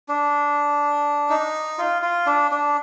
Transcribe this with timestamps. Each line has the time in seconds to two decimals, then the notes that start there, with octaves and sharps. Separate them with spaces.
0.08 D4
1.30 D#4
1.78 F4
2.02 F4
2.26 D4
2.51 D4